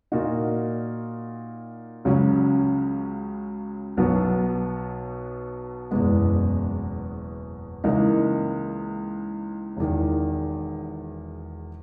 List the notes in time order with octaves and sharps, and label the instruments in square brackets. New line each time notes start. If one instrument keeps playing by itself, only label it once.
[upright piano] A#2 A#3 D#4 F#4
C#2 C#3 F#3 C#4
B1 B2 F#3 B3
F#1 E2 B2 G#3 B3
C#2 C#3 E3 A#3 D#4
E1 E2 D#3